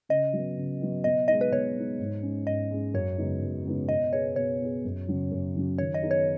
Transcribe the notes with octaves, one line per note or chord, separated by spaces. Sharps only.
C#3 D#5
F#3 B3
C#3
F#3 B3
B2 D#5
G#3 D#4 D#5
B4
B2 C#5
G#3 D#4
G#2
G#3 C#4
G#2 D#5
G#3 C#4
F#2 C#5
C#3 G#3 B3 D#4
F#2
C#3 G#3 B3 D#4
B2 D#5
B3 G#4 C#5
B2 C#5
B3 G#4
F#2
C#3 F#3 C#4 F#4
F#2
C#3 F#3 C#4 F#4
D#3 C#5
D#5
B3 D#4 G#4
C#5